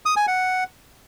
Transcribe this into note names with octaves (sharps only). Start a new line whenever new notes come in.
D#6
G#5
F#5